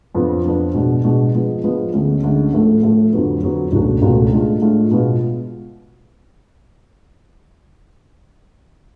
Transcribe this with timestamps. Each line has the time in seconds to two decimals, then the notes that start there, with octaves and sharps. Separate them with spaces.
0.15 F2 F3 B3 D4
0.44 F2 F3 B3 D4
0.74 B2 G#3 D4
1.04 B2 G#3 D4
1.34 F3 G#3 B3
1.64 F3 G#3 B3
1.93 D2 D3 G#3 C#4
2.23 D2 D3 G#3 C#4
2.53 A2 F3 A3
2.83 A2 F3 A3
3.13 F2 D3 F#3 B3
3.43 F2 D3 F#3 B3
3.72 C#2 B2 A3 D4 F#4
4.02 C#2 B2 A3 D4 F#4
4.32 A2 G#3 D4 F4
4.62 A2 G#3 D4 F4
4.91 B2 G#3 B3 F4